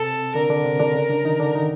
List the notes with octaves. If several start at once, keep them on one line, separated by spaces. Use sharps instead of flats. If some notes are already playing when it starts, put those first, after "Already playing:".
Already playing: C3 C4 A4
D3 D4 A#4
D3 D4
C3 C4
D3 D4
C#3 C#4
D3 D4
D#3 D#4
D3 D4
D#3 D#4